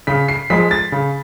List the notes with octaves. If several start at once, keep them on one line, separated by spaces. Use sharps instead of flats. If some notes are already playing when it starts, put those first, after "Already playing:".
C#3 B6
C7
F3 G#3 B6
A6
C#3